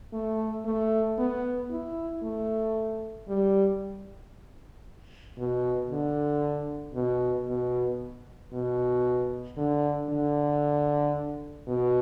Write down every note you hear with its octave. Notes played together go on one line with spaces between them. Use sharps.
A3
A3
B3
E4
A3
G3
B2
D3
B2
B2
B2
D3
D3
B2